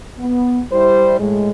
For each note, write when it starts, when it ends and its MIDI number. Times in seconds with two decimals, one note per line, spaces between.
0.19 0.60 59
0.72 1.16 55
0.72 1.16 64
0.72 1.16 72
1.20 1.51 45
1.20 1.51 56